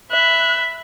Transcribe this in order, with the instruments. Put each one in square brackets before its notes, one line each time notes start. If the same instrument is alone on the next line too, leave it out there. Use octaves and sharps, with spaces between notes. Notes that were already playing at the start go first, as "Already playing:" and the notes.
[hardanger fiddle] E5 B5 [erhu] F#6